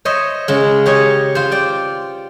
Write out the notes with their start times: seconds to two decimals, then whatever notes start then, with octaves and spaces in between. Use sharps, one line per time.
0.05 C5 C#5 D#5 E5
0.48 C#3 G#3
0.86 G4 C#5 D#5 G#5
1.35 F4 C5
1.52 D5 G5